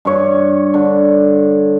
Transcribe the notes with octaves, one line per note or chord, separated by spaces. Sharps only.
G2 C#5
D3